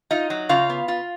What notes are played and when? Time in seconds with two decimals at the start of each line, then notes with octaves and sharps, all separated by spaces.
0.11 D#4 F4 D#5
0.30 F#3
0.49 C#3 F4 F5
0.70 B3
0.88 F4